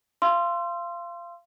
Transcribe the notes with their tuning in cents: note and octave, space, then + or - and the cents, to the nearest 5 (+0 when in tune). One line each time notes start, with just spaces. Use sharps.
F5 -25 C6 +0 E6 +40